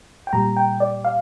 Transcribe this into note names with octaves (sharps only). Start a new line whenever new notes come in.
G5
A#2 G3 A#5
G5
D5
F5